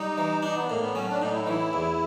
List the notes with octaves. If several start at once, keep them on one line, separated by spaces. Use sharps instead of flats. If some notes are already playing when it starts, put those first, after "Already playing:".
Already playing: G3 D#4
E3
D4 D#4
B3
A2 A#3
B3
F#3 C#4
D4
A2 D#4
E4
D#4
E3 E4
E2